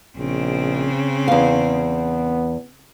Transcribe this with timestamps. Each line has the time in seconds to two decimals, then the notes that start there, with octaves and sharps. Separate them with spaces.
0.17 A#1 C#3 C4
1.28 E2 B3 F5